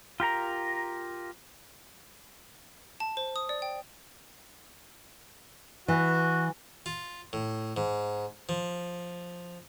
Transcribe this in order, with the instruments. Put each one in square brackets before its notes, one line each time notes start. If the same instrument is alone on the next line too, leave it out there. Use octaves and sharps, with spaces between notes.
[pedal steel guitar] F4 G4 A#4 A#5
[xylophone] A5
C5
D#6
D5
G5
[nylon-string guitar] E3 [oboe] F#4
[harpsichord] F4
A2
G#2
F3